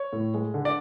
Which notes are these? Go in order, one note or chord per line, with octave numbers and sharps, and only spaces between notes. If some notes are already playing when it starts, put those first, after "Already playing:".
Already playing: C#5
A2
G#3
D3
D5